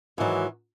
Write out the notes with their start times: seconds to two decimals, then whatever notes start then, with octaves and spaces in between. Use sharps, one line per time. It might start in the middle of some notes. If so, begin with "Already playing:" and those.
0.18 G#2 D#3 E3 F#3